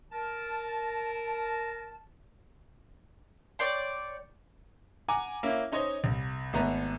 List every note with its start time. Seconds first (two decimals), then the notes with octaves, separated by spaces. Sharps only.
0.12 A#4 A5
3.59 C#5 D5 G5 C6
5.08 F#5 G#5 A#5 D6
5.43 A#3 C#4 E4
5.72 C#4 D#4 C5 C#5 D#5
6.04 C2
6.53 G#1 A3 B3 A#5